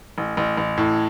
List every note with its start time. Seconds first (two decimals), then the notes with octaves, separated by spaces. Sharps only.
0.18 A1
0.37 A1
0.57 A1
0.77 A2